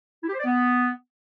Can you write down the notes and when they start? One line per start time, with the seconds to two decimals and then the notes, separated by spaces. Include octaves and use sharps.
0.23 E4
0.28 G4
0.34 C5
0.39 D5
0.44 B3